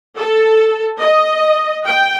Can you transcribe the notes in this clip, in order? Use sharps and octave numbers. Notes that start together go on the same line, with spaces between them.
A4
D#5
G5